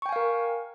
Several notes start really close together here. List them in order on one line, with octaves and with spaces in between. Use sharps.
C#6 G5 G#5 F5 A#4